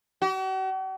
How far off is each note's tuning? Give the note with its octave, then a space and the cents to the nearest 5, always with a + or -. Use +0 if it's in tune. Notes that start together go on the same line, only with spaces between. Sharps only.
F#4 +45